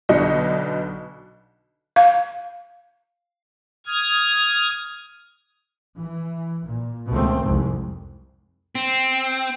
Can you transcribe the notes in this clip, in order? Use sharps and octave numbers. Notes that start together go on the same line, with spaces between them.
B1 B2 D3 D#5 C#7
F5
D#6 F6 G#6
E3
A#2
C#2 B2 D#3 A3 C4
C2 F2 G#2 C3
C4